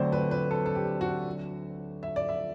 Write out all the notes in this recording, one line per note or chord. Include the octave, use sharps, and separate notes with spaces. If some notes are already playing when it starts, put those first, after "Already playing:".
Already playing: D2 D3 F#3 C4 C5
B4
B4
A4
A4
G4
F#4
E5
D5
E5